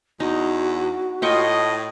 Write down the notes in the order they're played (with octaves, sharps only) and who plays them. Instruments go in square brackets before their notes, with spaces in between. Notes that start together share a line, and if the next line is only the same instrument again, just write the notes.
[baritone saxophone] E2 [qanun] D#4 [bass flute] F#4
[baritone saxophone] A2 [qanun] F4 G5 C#6 [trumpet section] D#5